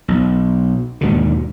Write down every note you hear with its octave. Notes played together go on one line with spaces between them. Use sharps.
B1
D#2 G#2 B2 D3